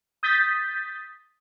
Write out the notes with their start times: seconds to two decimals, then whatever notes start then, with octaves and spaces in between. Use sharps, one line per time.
0.23 D#6 G6 A6 B6